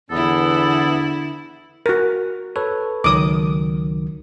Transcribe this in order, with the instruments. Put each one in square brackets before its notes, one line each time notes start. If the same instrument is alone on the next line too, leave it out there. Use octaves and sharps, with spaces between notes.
[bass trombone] E2 [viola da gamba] D3 E4 [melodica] B3 [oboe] A4
[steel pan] F#4 A#4
[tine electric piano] A4 B4 C#5
[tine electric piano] C#2 D#3 F#3 [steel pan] D6 D#6